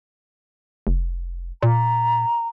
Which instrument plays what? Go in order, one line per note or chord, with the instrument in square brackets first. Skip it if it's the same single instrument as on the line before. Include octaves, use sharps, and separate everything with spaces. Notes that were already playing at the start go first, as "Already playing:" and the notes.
[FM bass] F1
[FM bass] A#2 [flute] A#5